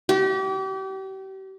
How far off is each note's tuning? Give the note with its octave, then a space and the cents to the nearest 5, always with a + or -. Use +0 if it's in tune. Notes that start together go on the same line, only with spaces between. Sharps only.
G4 -35